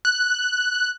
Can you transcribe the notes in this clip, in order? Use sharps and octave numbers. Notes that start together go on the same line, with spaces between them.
F#6